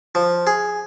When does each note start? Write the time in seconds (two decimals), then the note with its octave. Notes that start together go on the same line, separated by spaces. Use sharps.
0.15 F3
0.47 G#4